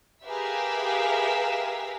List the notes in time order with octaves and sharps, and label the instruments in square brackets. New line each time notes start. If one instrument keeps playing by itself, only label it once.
[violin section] G4 G#4 A#4 B4 E5 F5